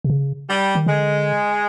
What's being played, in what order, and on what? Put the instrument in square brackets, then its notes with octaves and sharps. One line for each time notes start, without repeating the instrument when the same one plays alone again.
[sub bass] C3
C#3
[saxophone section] G3
[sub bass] D#3
[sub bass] D3 [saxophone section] G#3